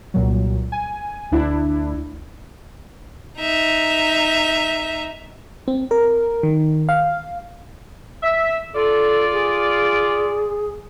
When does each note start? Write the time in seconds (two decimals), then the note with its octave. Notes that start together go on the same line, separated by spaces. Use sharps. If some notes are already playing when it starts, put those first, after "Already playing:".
0.14 C2 A#2 F#3
0.72 G#5
1.32 D2 D4 E4
3.38 D#4 E5
5.68 C4
5.91 A#4
6.43 D#3
6.89 F5
8.23 E5
8.75 F4 A4 D5
9.32 G#4